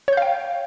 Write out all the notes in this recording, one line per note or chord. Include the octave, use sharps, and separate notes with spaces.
C#5 F5 G5 G6